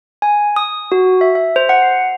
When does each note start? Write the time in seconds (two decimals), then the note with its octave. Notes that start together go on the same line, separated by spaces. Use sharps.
0.22 G#5
0.56 D#6
0.92 F#4
1.21 E5
1.35 E5
1.56 C5
1.69 F#5
1.82 C7